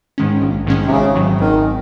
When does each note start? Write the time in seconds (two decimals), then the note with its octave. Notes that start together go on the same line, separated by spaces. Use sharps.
0.18 G#2 D#3 G#3 C#4
0.42 A#1
0.66 G#2 D#3 G#3 C#4
0.86 C3
0.91 G#1 C#3
1.15 G#2 D#3 F#3
1.40 G#1 D#3